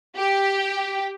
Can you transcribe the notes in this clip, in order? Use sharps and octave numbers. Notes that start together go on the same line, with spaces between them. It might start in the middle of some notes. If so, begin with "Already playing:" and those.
G4